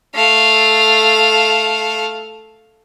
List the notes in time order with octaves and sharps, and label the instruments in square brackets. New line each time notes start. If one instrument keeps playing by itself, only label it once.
[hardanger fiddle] A3 F5